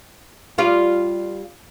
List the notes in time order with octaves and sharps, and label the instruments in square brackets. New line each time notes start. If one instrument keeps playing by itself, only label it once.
[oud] G3 F4 D5